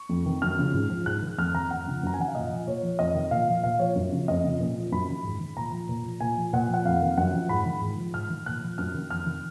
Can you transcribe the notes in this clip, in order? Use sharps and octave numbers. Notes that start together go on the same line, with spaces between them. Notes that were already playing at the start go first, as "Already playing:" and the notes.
Already playing: C#6
F2
D#3
F#2 F6
C#3 F3
G#2
F3
G#2 F#6
D#3
F2 F6
D#3 A#5
F2 F#5
C#3 F3
F#2 A#5
G#5
D#3 F#5
F5
A#2 D#5
F3
A#2 C#5
F3
F2 D#5
D#3
A#2 F5
F3
A#2 F5
F3 C#5
F#2
C#3 F3
F2 D#5
C#3 F3
A#2
F3
F#2 B5
D#3
G#2
D#3
A#2 A#5
F3
A#2
F3
A#2 G#5
F3
A#2 F#5
F3 F#5
F2 F5
D#3
F#2 F#5
F3
G#2 B5
D#3
G#2
F3
G#2 F6
D#3
A#2 F#6
F3
F#2 F6
D#3
F2 F6
D#3